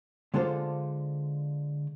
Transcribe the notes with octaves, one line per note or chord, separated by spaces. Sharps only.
D3 G#3 D4 F4 A4 C5